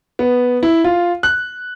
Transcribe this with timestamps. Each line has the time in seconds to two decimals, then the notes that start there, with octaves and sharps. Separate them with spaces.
0.19 B3
0.63 E4
0.84 F4
1.23 F#6